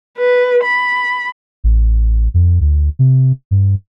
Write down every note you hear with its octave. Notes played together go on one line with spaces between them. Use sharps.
B4
B5
A1
F2
D2
C3
G2